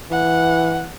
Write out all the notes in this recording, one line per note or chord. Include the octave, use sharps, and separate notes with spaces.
E3 F#5